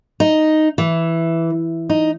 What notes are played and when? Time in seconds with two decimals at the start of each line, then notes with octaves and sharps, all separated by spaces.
0.20 D#4
0.78 E3
1.90 D#4